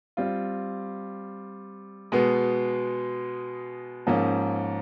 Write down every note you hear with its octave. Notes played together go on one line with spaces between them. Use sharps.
G3 C4 F4
B2 G#3 B3
G#2 F3 A#3 C#4